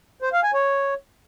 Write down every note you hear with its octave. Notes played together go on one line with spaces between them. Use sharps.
C5
F5
G#5
C#5